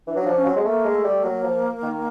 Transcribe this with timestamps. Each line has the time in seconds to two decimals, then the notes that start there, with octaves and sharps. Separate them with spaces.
0.07 E3 D4
0.16 F#3
0.21 F3 D4
0.36 C#4
0.45 F#3 C4
0.56 G#3
0.65 A3 A#3
0.85 G#3
0.95 A3
1.04 G3
1.23 F#3 A#3
1.43 F3
1.82 D#3